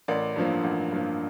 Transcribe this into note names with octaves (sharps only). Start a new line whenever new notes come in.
A1 A#4 D5
G2 F3 A#3
A1
G2 F3 A#3